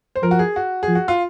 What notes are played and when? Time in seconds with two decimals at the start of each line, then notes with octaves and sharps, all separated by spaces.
0.16 C5
0.23 F3 A#4
0.31 F#4
0.39 G#4
0.56 F#4
0.83 G#4
0.88 F3
0.95 F#4
1.08 F4